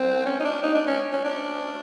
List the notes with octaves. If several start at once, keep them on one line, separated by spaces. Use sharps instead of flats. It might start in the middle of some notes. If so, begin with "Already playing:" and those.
Already playing: C4
C#4
D#4
D4
D#4
D4
C#4
C#4
D4